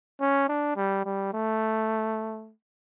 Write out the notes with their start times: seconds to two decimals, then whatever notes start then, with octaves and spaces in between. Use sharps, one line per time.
0.21 C#4
0.49 D4
0.77 G3
1.05 G3
1.34 A3